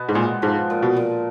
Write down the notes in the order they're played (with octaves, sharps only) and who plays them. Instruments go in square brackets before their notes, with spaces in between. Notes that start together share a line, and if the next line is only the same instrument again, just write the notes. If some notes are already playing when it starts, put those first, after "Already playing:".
Already playing: [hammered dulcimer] B2 B3
[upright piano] G#2
[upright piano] A#2 [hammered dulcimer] G#3
[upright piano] G#2 [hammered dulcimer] F3
[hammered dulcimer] A#2
[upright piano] B2
[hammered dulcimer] A#2